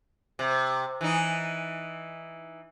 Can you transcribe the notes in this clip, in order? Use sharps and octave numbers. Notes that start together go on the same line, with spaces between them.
C3
E3 D#4